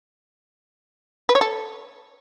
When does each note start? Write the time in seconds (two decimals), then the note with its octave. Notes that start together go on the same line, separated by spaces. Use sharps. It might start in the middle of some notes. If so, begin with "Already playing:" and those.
1.29 B4
1.35 C#5
1.41 A4